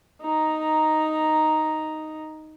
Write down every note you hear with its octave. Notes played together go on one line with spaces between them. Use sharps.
D#4 A#5